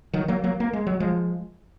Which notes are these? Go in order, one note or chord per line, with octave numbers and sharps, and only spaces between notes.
D#3 F#3
F#3 A#3
F#3 A#3
A#3
G#3
F#3
F3 G#3